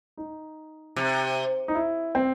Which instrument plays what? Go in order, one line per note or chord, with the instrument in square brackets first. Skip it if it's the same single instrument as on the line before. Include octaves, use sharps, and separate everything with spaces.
[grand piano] D#4
[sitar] C3
[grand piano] D#4
E4
C4